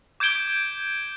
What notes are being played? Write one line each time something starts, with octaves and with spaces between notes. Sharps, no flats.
D6 G6 G#6 D7 G7